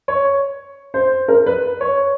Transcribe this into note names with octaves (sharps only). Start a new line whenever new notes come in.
C#5
C5
A#4
B4
C#5